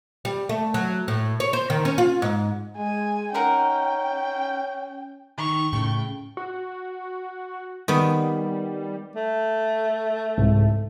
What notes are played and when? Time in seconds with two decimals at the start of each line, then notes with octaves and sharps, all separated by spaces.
0.25 G3
0.49 A3
0.74 F#3
1.08 A2
1.40 C#5
1.53 C5
1.70 D#3
1.85 C#4
1.98 F4
2.22 G#2
2.77 G#3 G#5
3.34 C#4 D#4 A#4 F#5 G5
5.38 D#3 C#6
5.73 A2 C#3 G5
6.37 F#4
7.88 D#3 G3 B3
9.16 A3
10.38 C2 G#2